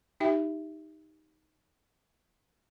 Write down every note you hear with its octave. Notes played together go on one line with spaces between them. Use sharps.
D#4 G4 E5 G5